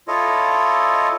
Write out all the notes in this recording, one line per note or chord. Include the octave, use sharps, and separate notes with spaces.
E4 F4 A4 C#5 D#5